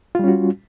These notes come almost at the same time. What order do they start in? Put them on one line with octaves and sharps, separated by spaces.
F4 G3 C#4 F#4